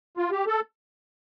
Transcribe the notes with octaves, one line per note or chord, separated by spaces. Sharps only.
F4
G4
A4